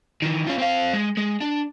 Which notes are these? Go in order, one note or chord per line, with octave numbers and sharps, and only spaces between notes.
D#3 E3
C#4 F4
C4 F5
G#3
G#3
D4